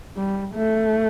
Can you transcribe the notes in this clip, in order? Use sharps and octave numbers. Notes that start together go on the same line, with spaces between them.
G3
A3